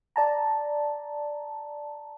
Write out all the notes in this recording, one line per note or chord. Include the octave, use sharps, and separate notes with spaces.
D5 A5 A#5